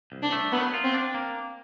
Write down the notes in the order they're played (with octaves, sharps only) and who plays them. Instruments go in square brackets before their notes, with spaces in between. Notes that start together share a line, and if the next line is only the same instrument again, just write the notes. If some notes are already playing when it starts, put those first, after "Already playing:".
[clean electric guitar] C2
[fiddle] D4
[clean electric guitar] A3
[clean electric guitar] F#3 [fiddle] B3
[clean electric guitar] F4
[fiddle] C4
[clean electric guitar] D4
A#3